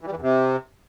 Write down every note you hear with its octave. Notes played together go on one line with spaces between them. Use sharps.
E3
G3
E3
E2
C3